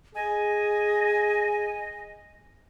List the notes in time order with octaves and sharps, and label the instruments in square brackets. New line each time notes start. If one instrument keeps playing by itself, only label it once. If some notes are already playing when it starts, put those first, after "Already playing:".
[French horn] G#4 [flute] D#5 [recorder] G#5